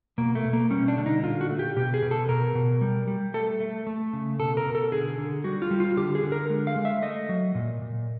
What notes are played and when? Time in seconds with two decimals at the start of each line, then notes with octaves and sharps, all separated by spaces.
0.18 B2 A#3
0.35 A3
0.45 B2
0.53 A#3
0.71 G3 C#4
0.88 D4
0.97 D3
1.06 D#4
1.23 A#2 F4
1.41 F#4
1.50 A3
1.59 G4
1.76 B2 G4
1.94 G#4
2.02 B2
2.11 A4
2.29 B2 A#4
2.55 B2
2.81 G3
3.08 G3
3.34 A3 A4
3.60 A3
3.87 A3
4.13 C#3
4.39 B2 A4
4.57 A#4
4.65 B2
4.75 A4
4.92 D3 G#4
5.18 D3
5.44 G3 F#4
5.62 F4
5.71 G3
5.80 F4
5.97 D3 G4
6.15 G#4
6.23 D3
6.32 A#4
6.50 G#3
6.67 F5
6.76 G#3
6.85 E5
7.02 A3 D#5
7.29 F#3
7.55 A#2
7.82 A#2